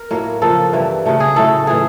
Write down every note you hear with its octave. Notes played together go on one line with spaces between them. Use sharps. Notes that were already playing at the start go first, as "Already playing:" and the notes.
Already playing: A#4
A2 F#3 A#3
C#3 F3 A#3 A4
G2 E3 G3
C#3 F#3 A3
G#4
A2 F#3 A3 A4
A2 E3 A3 G#4